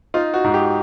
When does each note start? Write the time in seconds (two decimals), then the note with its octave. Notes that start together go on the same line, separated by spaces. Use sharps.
0.14 D#4 F4
0.34 F#4
0.44 G#2
0.54 G4